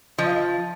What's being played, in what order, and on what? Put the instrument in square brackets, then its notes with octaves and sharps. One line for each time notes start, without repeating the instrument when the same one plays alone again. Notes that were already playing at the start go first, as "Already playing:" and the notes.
[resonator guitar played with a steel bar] F3 [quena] D#5
[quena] F5